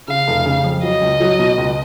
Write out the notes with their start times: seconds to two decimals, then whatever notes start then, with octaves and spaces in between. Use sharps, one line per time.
0.08 C#3 F5
0.28 F1
0.46 C#3
0.64 F2
0.83 F#3 D#5
1.01 C#2
1.20 F#3
1.39 B2
1.58 C#2